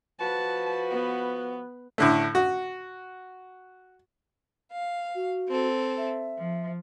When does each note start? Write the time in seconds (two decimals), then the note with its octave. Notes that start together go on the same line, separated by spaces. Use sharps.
0.20 F3 F#4 B4 A5
0.90 B3
1.98 A2 D3 A3
2.35 F#4
4.72 F5
5.15 F#4
5.49 C4 A4
5.98 E5
6.38 F3